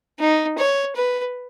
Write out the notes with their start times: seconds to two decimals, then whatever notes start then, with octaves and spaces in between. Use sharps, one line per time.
0.19 D#4
0.58 C#5
0.96 B4